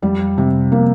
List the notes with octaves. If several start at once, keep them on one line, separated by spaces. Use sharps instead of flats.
F2 F3 G3
C3
F3 A#3